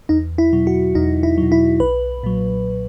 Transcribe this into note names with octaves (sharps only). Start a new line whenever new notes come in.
E2 D#4
E4
B2 F#3
F#4
E2 D#4
E4
B2 F#3
E4
B1 B4
A#2 F#3